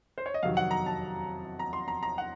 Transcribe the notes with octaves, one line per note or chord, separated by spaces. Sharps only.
C5
C#5
D#5
F2 C3 D#3 F#3 F5
F#5
A#5
A5
A#5
C6
A#5
A#5
F#5